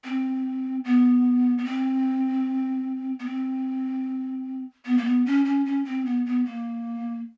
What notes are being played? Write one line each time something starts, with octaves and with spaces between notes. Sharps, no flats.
C4
B3
B3
C4
B3
C4
B3
A#3
B3
C#4
C#4
C#4
C4
B3
B3
A#3